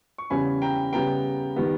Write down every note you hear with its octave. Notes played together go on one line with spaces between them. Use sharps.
C#6
E2 C#3 G3 C#4 G#5 B5
G5 A#5
C#3 G3 B3 G5 A#5
D#3 G3 B3